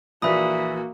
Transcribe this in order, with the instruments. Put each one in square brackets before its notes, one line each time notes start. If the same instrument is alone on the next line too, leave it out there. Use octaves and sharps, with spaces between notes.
[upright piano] A#1 E3 [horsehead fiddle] A#3 F#4 [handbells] E5 B5 D#6